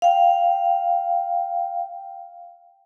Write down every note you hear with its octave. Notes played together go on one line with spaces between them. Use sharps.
F5 G5